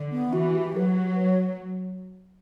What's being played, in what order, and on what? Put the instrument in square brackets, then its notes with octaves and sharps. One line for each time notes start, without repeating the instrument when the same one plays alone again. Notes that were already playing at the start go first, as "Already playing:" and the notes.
Already playing: [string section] D3
[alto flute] B3
[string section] E3 [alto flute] F#4
[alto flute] G4
[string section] F#3 [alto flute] B4
[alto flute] C#5